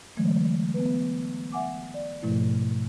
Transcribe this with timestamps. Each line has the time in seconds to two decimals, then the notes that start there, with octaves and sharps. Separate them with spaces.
0.17 D3 E3 F#3 G#3 A3
0.74 B3 B4
1.52 E5 F#5 G#5 D6
1.94 D5
2.22 G#2 B2 F3 A3 E4